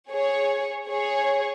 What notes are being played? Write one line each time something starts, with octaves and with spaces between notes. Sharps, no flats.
G#4 C#5
G#4 C#5